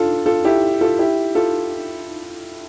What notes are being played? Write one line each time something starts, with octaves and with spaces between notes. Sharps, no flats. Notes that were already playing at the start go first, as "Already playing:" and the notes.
Already playing: D4 F4 A4
F4 A4
E4 G4
F4 A4
E4 G4
F4 A4